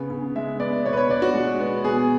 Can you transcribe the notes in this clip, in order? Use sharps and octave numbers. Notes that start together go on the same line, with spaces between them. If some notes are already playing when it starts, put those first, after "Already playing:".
Already playing: C#3 B3
C#3
G#3 E5
B3 D5
B2 C#5
B4
C#5
B2 D5
F#4
G#3
B3
B2 G#4